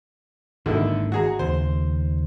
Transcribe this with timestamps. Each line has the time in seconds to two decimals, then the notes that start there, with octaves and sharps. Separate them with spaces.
0.66 G#1 D3 D#3 A#3 E4
1.12 F#4 G#4 A#5
1.39 D#2 C#3 C5